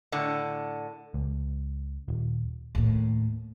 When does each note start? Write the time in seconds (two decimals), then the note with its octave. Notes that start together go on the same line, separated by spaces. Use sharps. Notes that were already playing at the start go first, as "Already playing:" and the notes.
0.12 A2 D3
1.14 C#2
2.08 D#1
2.75 D#2 A2